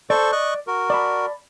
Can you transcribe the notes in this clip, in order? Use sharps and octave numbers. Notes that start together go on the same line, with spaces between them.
A4 C5 D5 C#6
D#5 C#6 F#6
F#4 A#4
D5 A5 B5